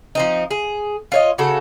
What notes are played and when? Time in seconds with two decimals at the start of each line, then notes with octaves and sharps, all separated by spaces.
0.15 F3 C4 D#4
0.51 G#4
1.12 F4 C#5 D#5
1.38 C#3 F#4 A4